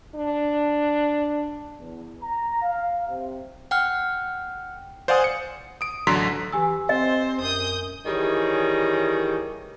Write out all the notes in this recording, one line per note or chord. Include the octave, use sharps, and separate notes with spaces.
D4
E2
A#5
F5
C3
F#5 G5 F6
C5 D5 F5 F#5 G#5 D#6
C#7
D#6 D7
A1 D3 F#3 A#5 C6 B6
E3 G4 G#5 E6
C4 C5 D#5
F#2 D#6 G6
D#3 E3 G3 G#4 C#5